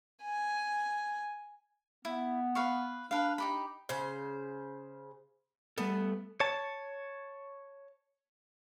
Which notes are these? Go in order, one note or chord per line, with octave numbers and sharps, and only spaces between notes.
G#5
B3 E4
B4 F5 C#6
D4 A#4 B4 F5
D#4 G4 B5
C#3 C5
G3 A3 B3 A4
C#5 A5